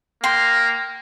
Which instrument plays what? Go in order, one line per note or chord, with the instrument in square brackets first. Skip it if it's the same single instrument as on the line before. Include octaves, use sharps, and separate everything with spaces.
[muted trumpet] A#3 [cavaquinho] G5 C6